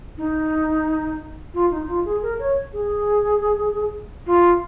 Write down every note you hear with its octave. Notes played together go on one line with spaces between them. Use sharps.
D#4
F4
D#4
F4
G#4
A#4
C#5
G#4
F4